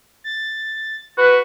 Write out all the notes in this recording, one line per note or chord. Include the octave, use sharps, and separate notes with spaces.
A6
F#4 B4